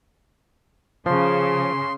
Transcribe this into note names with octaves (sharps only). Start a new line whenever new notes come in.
C#3 F3 C6